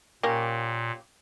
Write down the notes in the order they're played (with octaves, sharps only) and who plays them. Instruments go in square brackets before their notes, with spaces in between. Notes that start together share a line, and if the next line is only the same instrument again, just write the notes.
[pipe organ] A#2 [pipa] A#3 C#4 G4